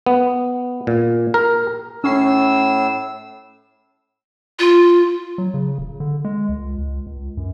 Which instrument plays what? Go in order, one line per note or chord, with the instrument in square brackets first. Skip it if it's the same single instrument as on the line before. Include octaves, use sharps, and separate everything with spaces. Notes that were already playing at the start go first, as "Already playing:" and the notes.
[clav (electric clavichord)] B3
A#2
A#4
[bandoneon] A2 E6 [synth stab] C#4 C7
[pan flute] F4
[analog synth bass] F#3
C#3
D#1
D3
G#3
C#2
C#2
C#2
F#2